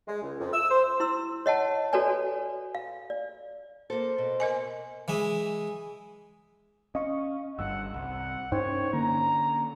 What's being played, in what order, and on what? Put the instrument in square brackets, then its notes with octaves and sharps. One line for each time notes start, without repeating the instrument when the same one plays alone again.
[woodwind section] G#3
C#2
F2
E6
C5
[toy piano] E4 C6 E6
C#5 D#5 F#5 A5
F#4 A4 B4 C#5 D5 G#5
F5
D5
[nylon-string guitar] A#3 A4 [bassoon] C5
[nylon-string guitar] B2
[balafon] A#4 D#5 G#5
[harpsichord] E3 G#3 E5
[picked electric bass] C#4 [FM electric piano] D#5 F5 C#6
[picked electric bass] G1 G2 [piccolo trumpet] F#5 [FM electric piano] E6
[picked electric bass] C2 [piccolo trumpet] F#5
[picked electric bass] G2 C#4 [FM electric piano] D#4 C5 G5 [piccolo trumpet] C#5
[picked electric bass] D3 C#4 [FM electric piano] A#3 [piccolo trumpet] A#5